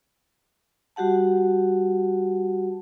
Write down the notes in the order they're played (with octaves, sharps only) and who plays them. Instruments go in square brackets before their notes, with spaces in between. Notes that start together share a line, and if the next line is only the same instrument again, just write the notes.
[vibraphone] G3 F#4 G4 F#5 A5